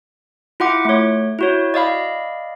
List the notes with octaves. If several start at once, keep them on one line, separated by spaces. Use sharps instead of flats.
E4 F4 F#5 D6
A3 C#5
E4 F#4 C#5
D5 D#5 F5 B5